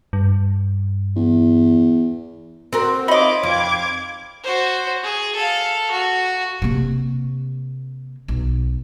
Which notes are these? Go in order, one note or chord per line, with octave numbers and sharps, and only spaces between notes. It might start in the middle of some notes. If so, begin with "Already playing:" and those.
G2
E2
C4 F#4 A#4
D#4 F4 C#5 D#5 B5 D6
F2 F5 D6 G#6
F#4 C5
G#4
A4 F5
F#4
C3 A#3
B1